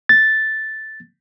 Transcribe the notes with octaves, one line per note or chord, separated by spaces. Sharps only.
A6